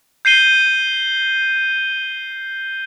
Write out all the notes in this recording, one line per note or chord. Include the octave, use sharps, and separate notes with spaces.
G6 C7 D#7 G7